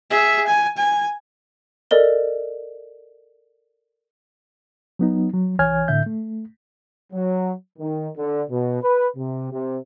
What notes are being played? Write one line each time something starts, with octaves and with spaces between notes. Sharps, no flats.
G#4 E5
G#5
G#5
A4 A#4 D5 D#5 G7
F#3 B3 D#4
F#3
C2 E3 C#5 G#5 F6 G#6
A2 D3 E5 G6
A3
F#3
D#3
D3
B2
B4
C3
C3